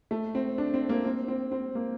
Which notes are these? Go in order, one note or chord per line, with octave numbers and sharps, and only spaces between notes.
A3
C4
D4
C4
A#3
C4
C4
C4
A#3